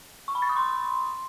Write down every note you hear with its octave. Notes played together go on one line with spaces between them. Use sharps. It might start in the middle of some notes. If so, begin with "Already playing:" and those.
C#6
B5
A6
D#6
C6